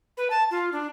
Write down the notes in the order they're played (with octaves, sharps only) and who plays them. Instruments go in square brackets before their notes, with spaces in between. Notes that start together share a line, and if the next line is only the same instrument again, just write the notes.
[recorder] B4
A5
F4
D4